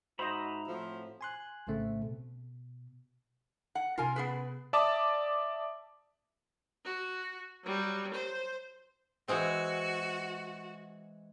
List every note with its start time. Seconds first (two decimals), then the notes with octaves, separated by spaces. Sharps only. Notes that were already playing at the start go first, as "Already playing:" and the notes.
0.19 G#2 D#4 F#4 C5 D#5 E5 A#5 B5
0.68 A2 F3 C4 F#4
1.21 G#5 C6 F#6
1.67 A#1 A2 C#3 A3 C4
2.02 B2
3.75 F#5
3.98 C3 C#4 F4 A#4 G#5
4.16 B3 G#4 B4
4.73 D5 E5 A5 D6 D#6
6.85 F#4
7.64 F#3 G3
8.14 C5
9.28 E3 G#3 C4 F#4